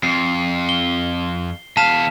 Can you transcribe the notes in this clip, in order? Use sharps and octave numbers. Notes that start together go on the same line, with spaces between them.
F2 C7
G7
E2 F5 A5 B6 E7